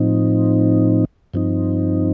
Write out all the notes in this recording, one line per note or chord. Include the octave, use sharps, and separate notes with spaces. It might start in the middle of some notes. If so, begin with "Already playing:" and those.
Already playing: A2 F3 C4 D#4
G2 F3 C4 D#4